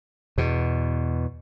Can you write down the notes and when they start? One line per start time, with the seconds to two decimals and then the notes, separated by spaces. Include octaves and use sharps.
0.38 E2 B2